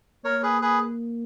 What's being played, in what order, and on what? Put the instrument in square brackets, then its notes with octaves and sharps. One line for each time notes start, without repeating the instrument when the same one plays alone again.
[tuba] A#3 [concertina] A#4 C#5
[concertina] G#4 B4
G#4 B4